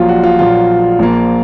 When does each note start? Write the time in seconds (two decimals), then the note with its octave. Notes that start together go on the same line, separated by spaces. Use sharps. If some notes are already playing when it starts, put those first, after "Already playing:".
Already playing: A#1 A#2 F#3 F4
0.09 F#4
0.24 F4
0.39 A#1 A#2 F#3 F4
0.99 A#1 A#2 F3 A#3